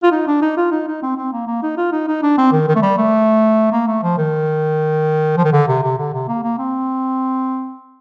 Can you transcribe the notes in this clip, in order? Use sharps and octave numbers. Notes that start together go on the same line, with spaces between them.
F4
D#4
D4
D#4
F4
D#4
D#4
C4
C4
A#3
A#3
D#4
F4
D#4
D#4
D4
C4
D#3
D#3
A3
G3
A3
A#3
A3
F3
D#3
F3
D#3
D3
C3
C3
D3
C3
A#3
A#3
C4